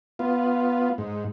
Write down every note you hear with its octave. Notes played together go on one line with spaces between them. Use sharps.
B3 F4
G#2